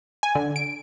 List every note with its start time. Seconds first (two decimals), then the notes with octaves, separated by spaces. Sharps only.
0.23 G#5
0.35 D3
0.56 D7